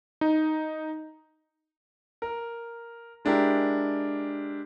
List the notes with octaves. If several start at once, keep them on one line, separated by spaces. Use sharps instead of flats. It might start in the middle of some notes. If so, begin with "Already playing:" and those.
D#4
A#4
G#3 D4 E4 G4 A#4